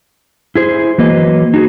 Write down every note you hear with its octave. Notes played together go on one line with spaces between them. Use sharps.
E4 G#4 C5
E3 F#3 A#3 B4 D#5
D#4 F#4 G#4